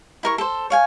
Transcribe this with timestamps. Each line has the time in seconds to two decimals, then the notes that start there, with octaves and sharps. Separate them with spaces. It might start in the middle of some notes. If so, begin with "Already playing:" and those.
0.23 E4 A#4 C#6
0.38 A4 C5
0.70 C#5 F5 G#5